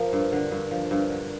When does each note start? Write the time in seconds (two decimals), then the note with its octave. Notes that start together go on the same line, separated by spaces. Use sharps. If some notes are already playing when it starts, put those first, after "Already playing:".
Already playing: F3 A#4
0.13 G2
0.32 D3
0.51 G2
0.71 F3
0.91 G2
1.10 D3